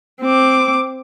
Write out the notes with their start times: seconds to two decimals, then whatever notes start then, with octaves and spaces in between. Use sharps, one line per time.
0.21 C4 D6